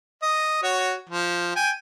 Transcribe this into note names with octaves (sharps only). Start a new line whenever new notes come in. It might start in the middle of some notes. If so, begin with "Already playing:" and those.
D#5
F#4 C#5
F3
G5 G#5